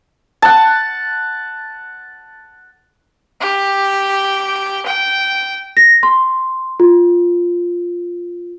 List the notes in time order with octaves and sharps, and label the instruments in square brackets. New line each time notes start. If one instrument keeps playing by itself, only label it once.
[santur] F#5 A5
[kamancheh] G4
G5
[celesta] A#6
C6
F4